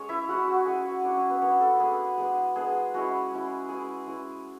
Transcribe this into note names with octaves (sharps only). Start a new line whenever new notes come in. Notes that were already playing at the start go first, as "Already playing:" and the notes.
Already playing: G#3 C#4 C#5
E4 E5
G#3 C#4 E4 F#4 F#5
F#4 F#5
G#3 C#4 E4 G#4 G#5
F#4 F#5
G#3 C#4 D4 E4 D5
C#4 C#5
B3 B4
G#3 B3 C#4 D4 C#5
A3 A4
G#3 B3 D4 G#4
G#3 B3 D4
G#3 B3 D4 G#4
G#3 C#4 E4 F#4
G#3 C#4 E4
G#3 C#4 E4 G#4
G#3 C#4 E4